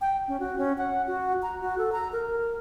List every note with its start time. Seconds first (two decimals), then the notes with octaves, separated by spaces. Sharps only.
0.01 G5
0.28 C#4
0.40 F#4
0.58 C#4
0.78 F#5
1.07 F#4
1.42 A#5
1.61 F#4
1.78 A4
1.92 A#5
2.12 A#4